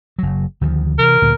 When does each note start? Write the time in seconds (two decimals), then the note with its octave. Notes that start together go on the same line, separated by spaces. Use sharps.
0.19 F#1 F#3
0.61 D2 D#3 F3
0.99 C3 E3 A#4
1.22 D2 A#2 D3